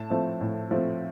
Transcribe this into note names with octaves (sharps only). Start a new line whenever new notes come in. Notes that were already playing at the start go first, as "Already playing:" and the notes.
Already playing: A2 A5
F3 A3 C4
A2
F3 A3 C4